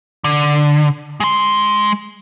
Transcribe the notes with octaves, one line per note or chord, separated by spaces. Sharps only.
D3
G#3 C6